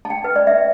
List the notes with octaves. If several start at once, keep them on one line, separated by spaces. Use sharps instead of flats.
A5
G5
B4
D5
E5